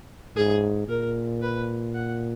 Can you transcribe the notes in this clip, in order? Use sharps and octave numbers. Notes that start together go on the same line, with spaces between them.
G#2 G#4
A#2 A#4
B4
F#5